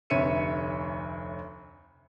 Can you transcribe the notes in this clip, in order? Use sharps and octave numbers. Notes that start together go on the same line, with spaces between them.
F1 D2 C#5 E5 C#7 D#7